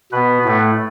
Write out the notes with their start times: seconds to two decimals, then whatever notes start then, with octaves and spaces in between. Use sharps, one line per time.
0.12 B2 B3 B4
0.45 A2 A3